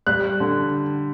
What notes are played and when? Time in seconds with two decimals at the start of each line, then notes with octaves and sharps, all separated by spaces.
0.07 G3 F#6
0.40 D3